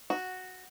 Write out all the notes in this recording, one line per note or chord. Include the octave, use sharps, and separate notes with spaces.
F#4